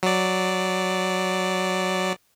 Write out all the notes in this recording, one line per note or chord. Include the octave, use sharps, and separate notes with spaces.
F#3 D5